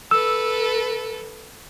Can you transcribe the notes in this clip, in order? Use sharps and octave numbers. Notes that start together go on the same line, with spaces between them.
A4 B4 E6